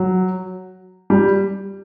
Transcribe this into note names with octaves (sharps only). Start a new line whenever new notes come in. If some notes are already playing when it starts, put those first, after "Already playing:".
Already playing: F#3
G3